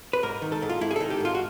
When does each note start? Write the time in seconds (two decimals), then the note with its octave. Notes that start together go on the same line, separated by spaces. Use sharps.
0.13 B4
0.23 G#2 A#4
0.42 D#3
0.52 A4
0.62 G#2
0.69 F4
0.81 G#2 E4
0.91 G#4
0.96 D#3 A4
1.10 G4
1.20 G#2 F4
1.35 F#4